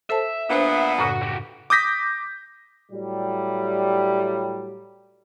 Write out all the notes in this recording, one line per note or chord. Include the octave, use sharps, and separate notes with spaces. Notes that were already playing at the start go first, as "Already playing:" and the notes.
A4 C5 E5 A5
A#2 B3 D4 C5
F#2 A2 C#3 F#4
F#4 G4
D6 D#6 G6 A#6 B6
A2 F#3 G3